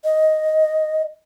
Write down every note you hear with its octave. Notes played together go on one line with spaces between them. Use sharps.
D#5